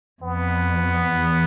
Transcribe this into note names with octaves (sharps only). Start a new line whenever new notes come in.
F2 B3
E2